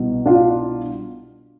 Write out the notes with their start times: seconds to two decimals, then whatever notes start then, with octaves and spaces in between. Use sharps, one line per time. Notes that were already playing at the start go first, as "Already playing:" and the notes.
Already playing: C2 B2
0.26 D4 F4